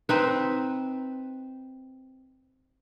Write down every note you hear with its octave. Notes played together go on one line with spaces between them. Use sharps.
C4 D#4 B4